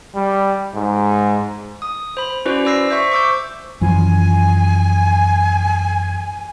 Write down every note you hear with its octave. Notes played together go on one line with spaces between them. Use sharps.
G3
G#2
D#6
C5 B5
C#4 E4 F#4 B4 C5 D5
C5 D5 E6 A#6 C7
C5 E5 C#6
C#6 D6 E6 G6
F#2 E3 F3 G#5